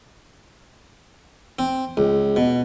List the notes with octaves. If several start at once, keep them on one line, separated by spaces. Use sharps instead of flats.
C4
C#2
B2